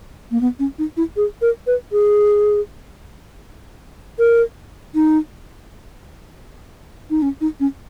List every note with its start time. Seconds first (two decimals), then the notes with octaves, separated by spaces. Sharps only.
0.31 A#3
0.41 B3
0.59 C#4
0.79 D#4
0.97 E4
1.17 G#4
1.42 A#4
1.67 B4
1.92 G#4
4.19 A#4
4.95 D#4
7.10 D#4
7.22 C#4
7.41 D#4
7.60 C#4